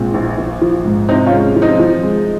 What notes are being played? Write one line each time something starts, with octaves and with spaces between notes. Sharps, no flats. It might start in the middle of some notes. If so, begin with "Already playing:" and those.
Already playing: A#1 A#2 G#3 C4
A#1
A#1
F3
G#2
C3 C4 D#4
C#4 F4
G#3
F3
C4 D#4
F3
G#3